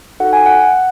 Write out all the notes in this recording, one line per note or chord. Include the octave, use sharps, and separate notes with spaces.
D#4 F#4 A4 F#5
G#5
F#5
F#5